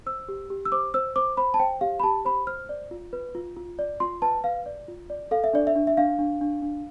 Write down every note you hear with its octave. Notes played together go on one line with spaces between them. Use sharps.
C5 E6
G4
G4
E6
C5 D6
C5 E6
C5 D6
C5 B5
A5
C5 G5
G4 F5
B5
G4 A5
C5 B5
C5 F6
D5
F4
B4
F4
F4
D5
F4 C6
B4 A5
B4 F5
D5
F4
D5
A4 F5
E5
D4 D5
E5
D4
E5
D4 F5
D4
D4
D4